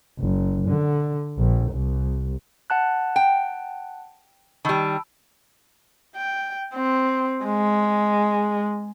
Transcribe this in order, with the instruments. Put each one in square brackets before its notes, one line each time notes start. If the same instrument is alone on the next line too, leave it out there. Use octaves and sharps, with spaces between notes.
[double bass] F#1
D3
A#1
C2
[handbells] F#5 A5 F#6
[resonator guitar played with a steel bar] G5
[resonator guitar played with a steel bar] D#3 G3 [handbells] A5 B5 E6
[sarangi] G5
C4
G#3